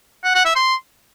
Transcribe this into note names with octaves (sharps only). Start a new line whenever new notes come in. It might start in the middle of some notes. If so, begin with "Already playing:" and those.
F#5
F#5
E5
C6